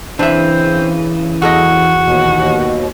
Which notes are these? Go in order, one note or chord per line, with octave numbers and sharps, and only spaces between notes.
C#3 E3 C4 D4 E5
E2 F#4 A4 D#5
D#2 B2